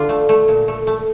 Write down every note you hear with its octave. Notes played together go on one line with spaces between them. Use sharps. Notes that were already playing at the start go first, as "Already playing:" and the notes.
Already playing: D3 D4 F4
A3
A3
A#2
A3
A3